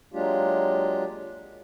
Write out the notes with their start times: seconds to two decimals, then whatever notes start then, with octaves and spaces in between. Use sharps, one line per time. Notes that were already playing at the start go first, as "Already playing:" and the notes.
0.14 F#3 G#3 A#3 D4 F4 G4